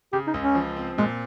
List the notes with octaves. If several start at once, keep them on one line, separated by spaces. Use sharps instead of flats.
C#3 G4
D#4
C#2
C#4
F3
C4
A#2 G#3